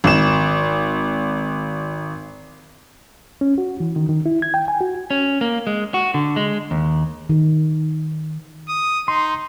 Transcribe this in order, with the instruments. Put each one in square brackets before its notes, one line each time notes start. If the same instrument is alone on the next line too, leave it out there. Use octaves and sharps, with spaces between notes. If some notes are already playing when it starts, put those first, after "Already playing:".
[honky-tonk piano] G#1 E7
[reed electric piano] C#4
F#4
E3
D#3
D#3
E4
G#6
G5
G#5
F#4
[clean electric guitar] C#4
A#3
G#3
F#4
D3
G#3
D#2
[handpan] D#3
[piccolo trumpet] D#6
[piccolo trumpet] D#4 [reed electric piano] C6